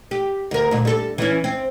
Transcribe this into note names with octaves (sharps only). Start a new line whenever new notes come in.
G4
D2 A#4
D2 A#2
G3 A4
E3 C#4
C4